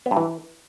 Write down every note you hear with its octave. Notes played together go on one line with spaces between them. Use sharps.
B3
G2
E3